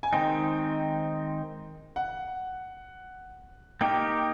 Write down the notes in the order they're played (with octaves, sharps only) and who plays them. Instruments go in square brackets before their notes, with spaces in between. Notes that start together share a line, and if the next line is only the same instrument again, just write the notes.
[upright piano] G#5
[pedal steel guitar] D#3 G#3 C4 D#4 [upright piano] G5
[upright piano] F#5
[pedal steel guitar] A#3 D#4 G4 A#4 [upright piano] G5